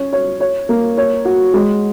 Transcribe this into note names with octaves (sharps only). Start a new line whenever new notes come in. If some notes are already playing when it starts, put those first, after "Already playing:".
Already playing: C#4 C#5
C#5
C#5
A#3
C#5
F#4
G#3